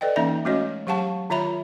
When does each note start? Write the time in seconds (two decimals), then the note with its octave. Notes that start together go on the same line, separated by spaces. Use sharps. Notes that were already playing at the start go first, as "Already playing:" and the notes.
0.01 A4 B4 D5 D#5 G5
0.16 E3 A#3 C#4 D#4 E5 A#5
0.45 G#3 A3 C#4 F#4 C#5 D#5
0.87 F#3 G4 F5 F#5 A5 C#6
1.30 D#3 F4 C#5 E5 A#5 B5